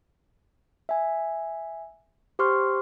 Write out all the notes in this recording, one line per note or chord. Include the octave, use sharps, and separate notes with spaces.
E5 G#5
G4 C5 C6 C#6 F6